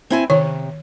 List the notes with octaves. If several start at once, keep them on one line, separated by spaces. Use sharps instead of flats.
C4 E4 G#5
C3 D#3 C#5